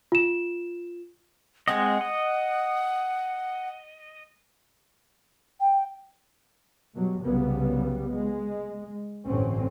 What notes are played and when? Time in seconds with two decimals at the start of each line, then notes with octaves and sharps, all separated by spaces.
0.12 F4 E7
1.68 G#3 C4 D#5 F#5
2.01 D#5
5.60 G5
6.95 B2 F#3 G3
7.24 C2 C#3 F#3 G3 B3
8.13 G#3
9.26 A1 G2 D3 C4 C#4